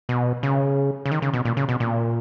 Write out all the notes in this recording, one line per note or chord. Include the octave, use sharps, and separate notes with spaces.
B2
C#3
C#3
D#3
C#3
B2
A#2
C#3
B2
A#2